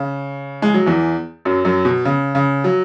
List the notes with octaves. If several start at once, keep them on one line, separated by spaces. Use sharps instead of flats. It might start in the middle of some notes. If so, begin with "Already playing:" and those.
Already playing: C#3
G#3
F#3
E2 E3
F#2 F#3
F#2 F#3
B2
C#3
C#3
F#3